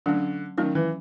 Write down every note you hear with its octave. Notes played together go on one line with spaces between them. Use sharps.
D3 F#3 A3 C#4
D#3 F#3 A3 C#4
E3